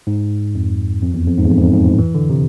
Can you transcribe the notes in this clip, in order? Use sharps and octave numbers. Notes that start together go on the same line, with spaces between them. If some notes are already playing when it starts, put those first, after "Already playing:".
G#2
F2
F2
E2
F2
G#2
E2
F2
G#2
F2
G#2
A2
E3
D3
C3